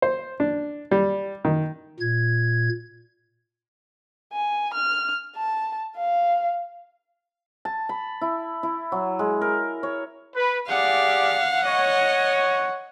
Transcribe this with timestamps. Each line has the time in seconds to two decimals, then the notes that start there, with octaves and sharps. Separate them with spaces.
0.02 C5
0.40 D4
0.91 G3
1.45 D#3
2.00 A#2 G#6
4.33 G#5
4.74 F6
5.35 A5
5.96 F5
7.65 A5
7.89 B5
8.22 E4
8.63 E4
8.92 F#3
9.19 G#3
9.41 A#4
9.83 C#5
10.36 B4
10.69 G4 G#4 D5 F5 F#5
11.65 C#5 D#5